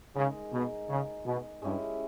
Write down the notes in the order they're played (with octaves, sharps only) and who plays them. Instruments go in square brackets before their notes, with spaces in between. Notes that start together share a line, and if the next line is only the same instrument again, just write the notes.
[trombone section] C#3 [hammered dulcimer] G#3 D#4 A#4
[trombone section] B2
C#3
B2
[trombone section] G2 [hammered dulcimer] G#3 C#4 E4 G4